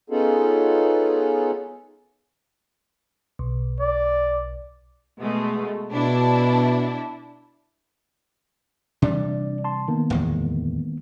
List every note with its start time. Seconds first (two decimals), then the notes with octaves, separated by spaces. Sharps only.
0.10 B3 C#4 D#4 F4 G#4 A4
3.39 B1
3.80 D5
5.20 B2 G#3 A3
5.94 B2 D4 E4
9.02 C3 E3 G3 D4 D5
9.64 A5 C6
9.88 D#3 A#3 B3
10.10 D1 E2 G#3